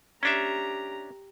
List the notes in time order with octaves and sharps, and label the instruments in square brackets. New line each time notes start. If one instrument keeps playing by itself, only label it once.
[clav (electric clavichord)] C#4 D4 E5 [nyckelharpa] G4 A#5